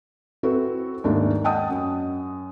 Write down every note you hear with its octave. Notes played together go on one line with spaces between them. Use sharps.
C4 E4 F#4 A4 B4
D#2 G#2 A3 D4 D#4
D#5 F#5 G5 A5 D#6
F#2